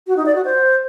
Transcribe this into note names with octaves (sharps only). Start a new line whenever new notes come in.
F#4
D#4
D5
F#4
C5